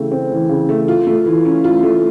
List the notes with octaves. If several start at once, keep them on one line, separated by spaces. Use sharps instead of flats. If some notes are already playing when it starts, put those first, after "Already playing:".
Already playing: C#3 E3 A3 C4
C4
E3
C#3
A3
F4
A3
E3
C#4
F4
A3